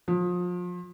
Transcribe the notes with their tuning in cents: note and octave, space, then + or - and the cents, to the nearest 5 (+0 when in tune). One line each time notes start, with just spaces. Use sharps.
F3 +30